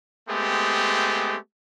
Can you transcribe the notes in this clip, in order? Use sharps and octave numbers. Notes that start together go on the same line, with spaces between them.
G#3 A3 B3 C4 G4